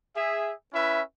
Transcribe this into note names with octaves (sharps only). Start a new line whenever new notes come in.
G#4 E5
C#4 E4 B4 E5